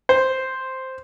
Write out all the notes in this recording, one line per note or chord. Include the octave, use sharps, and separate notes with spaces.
C5